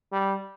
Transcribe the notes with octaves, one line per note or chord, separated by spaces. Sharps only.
G3